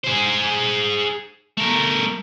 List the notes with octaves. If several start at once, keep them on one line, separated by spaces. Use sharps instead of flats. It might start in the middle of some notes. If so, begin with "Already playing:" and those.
G#4 C5
A3 A#4